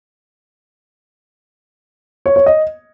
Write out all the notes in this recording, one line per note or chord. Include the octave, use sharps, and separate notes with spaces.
C#5
C#5
D#5